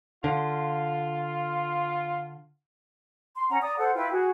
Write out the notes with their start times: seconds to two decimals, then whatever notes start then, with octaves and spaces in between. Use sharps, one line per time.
0.24 D3 F4
3.36 C6
3.50 C#4 F#5 A#5
3.62 D5 A#5 D#6
3.78 A4 C5 F#5
3.95 E4 F4 B4 G5
4.11 F#4 G#4